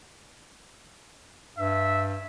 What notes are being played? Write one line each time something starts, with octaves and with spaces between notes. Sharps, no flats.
G2 E5